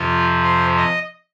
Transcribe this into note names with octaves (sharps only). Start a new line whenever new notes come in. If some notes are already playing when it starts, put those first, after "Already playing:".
Already playing: F2 C3 F3 F4
C5
D#5